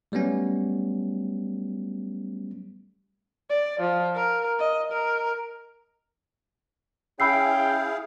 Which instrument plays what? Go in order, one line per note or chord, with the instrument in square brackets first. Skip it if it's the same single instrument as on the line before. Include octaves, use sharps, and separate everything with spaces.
[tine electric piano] F#3 G3 A3 B3 C#4
[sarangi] D5
F3
A#4
D#5
A#4
[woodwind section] C#4 G5 [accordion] E4 G#4 F5 [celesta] B5 E6 C7